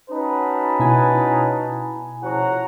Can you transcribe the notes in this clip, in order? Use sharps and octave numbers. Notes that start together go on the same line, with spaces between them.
C#4 D#4 F#4 B4 A5
B2 E4 G#5
C#3 F3 F#4 C#5 F#5 A#5